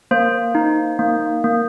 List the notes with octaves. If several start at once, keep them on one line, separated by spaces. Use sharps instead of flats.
A#3 C5
D#4
A#3
A#3